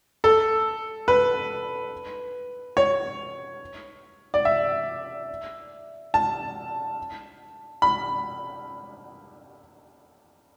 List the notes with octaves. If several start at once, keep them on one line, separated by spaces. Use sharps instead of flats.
A4
B4
C#5
D5
E5
A5
B5